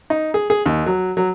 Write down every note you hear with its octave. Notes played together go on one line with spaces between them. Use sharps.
D#4
G#4
G#4
D#2
F#3
F#3